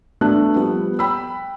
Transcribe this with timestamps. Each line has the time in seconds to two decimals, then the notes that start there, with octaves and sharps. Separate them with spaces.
0.21 A3 B3 D4 F#6
0.56 F3 G3 B3
0.99 G5 B5 E6